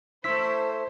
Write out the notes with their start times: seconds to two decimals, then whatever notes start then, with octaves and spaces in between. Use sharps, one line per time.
0.24 A3 E4 C5 C6 E6 B6